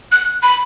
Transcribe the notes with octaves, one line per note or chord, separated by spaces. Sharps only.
F#6
B5